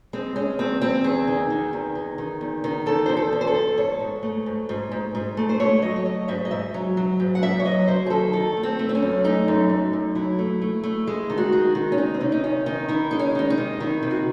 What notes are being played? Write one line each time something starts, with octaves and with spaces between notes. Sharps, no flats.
G#3 C4
G#3 C#4
E2 C4
E2 C4
E2 G#4
D#3
D#3
E2
D#3
D#3
E2
D#3
E2 A4
E2 C5
A4
E2
C5
A4
E2
G#2 C#5
G#2
A3
G#2
G#2
G#2
G#2
A3
C5
A3 C#5
F#3 D#5
C#5
F#3 D#5
G#2 E5
D#5
G#2 E5
F#3
F#3
G#2
F#5
F#2 E5
C#5
F#3 D#5
F#3 C5
G#4
D#3 A4
D#3 A4
A3
C4
A3
C4
C#4
F#2
A3 D#4
F#2
F#2
F#2
F#3 E4
A3
A3
A3
G#3
D#3
F#4
G#3
D#3
C#4
D#3 D#4
C4
C3 C#4
D#4
D#3 C#4
D#3 D#4
D#3 E4
G#3 D#4
C#4
D#3 C#4
D#4
C3
D#3 E4
C3
F#4